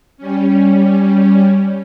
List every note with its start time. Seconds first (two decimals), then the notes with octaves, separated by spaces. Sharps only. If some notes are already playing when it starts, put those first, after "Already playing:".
0.18 G3 C#4